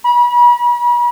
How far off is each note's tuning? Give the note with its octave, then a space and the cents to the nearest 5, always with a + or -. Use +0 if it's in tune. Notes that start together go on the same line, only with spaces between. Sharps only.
B5 -40